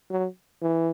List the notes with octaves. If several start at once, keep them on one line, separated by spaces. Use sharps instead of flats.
F#3
E3